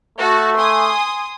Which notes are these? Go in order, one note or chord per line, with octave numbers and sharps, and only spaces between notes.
A3 F#4 A5
G#5 C6 D#6